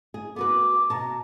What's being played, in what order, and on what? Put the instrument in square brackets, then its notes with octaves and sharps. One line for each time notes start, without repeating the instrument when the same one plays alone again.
[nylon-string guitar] G#4
[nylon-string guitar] B3 F#4 B4 [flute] D6
[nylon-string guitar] B2 A5 [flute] A#5